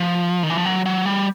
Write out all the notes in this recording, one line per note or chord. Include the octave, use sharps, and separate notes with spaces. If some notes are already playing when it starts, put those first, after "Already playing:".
Already playing: F3
D#3
E3
F3
F#3
F#3
G3